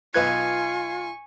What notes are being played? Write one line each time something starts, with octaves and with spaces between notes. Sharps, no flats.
B1 F4 B4 G#5 C#6 F#6 G#6